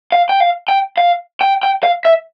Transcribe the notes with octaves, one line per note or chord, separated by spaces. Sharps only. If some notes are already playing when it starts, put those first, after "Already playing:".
F5
G5
F5
G5
F5
G5
G5
F5
E5